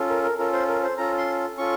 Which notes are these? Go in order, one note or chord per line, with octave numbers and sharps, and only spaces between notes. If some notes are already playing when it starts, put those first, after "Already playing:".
Already playing: C#4 F4 A4
A#4
A#4
C#4 F4 A4 A#4
C5
A#4
C5
C#4 F4 A4 A#5
C6
C#4 F4 A4 C#6